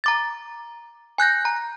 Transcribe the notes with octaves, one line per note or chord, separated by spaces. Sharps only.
A#5 D6 A6
G#5 F#6 G6 A#6
A#5